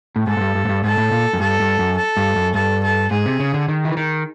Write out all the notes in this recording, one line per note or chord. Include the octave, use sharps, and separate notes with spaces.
A2
G#2 A4
G#2
G2
G2
G#2
G2
G#2 A4
A2
A#2
F#2
G2 A4
G2
F#2
A4
G2
F#2
G2 A4
A4
G#2 G#4
C3
C#3
D3
D#3
E3
D#3